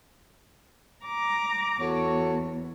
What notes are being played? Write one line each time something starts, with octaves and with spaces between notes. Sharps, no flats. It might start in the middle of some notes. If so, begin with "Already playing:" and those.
A#5 D6
E2 F#4 A4 C#5